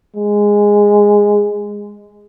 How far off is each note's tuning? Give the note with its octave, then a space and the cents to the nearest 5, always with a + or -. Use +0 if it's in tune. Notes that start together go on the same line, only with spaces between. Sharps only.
G#3 -10